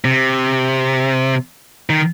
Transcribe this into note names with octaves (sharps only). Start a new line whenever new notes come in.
C3
D#3